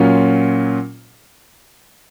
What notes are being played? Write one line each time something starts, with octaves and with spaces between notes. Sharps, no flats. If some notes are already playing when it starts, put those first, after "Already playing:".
Already playing: A#2 F#3 C#4 F4